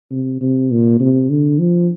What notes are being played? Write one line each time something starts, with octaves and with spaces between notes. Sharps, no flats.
C3
C3
A#2
C3
D3
F3